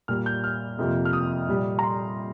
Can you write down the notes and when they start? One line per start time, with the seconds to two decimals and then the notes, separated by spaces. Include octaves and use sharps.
0.08 A#2 G3 A#3 F6
0.26 G6
0.44 F6
0.79 F2 C3 F3 A#3
1.05 F6
1.13 D#6
1.49 A#2 G3 A#3
1.79 A#5
1.83 C6